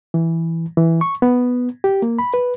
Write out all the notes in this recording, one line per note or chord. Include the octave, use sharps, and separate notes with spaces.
E3
E3
C#6
B3
G4
A#3
B5
B4